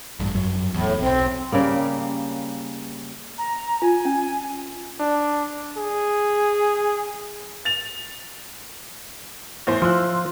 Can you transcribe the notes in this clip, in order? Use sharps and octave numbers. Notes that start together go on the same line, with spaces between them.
A1 G2
G#1 F#2 F#3
D1 E2 A2
B1 C4
C#3 G3 A#3
A#5
F4 G#5
C#4
D4
G#4
A6 F7
E2 A2 C5
F3 C6 E6 F#6